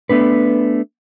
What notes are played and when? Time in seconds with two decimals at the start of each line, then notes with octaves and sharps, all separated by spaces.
0.09 A3 B3 D4 B4